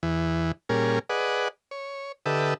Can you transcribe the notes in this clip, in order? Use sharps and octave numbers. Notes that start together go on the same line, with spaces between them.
E2 E3
A#2 G3 C#4 G#4 A#4
G#4 B4 D5 D#5 F#5
C#5
D3 G4 A4 B4 D#5 E5